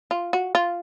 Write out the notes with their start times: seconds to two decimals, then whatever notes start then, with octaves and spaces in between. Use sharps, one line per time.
0.11 F4
0.33 F#4
0.55 F4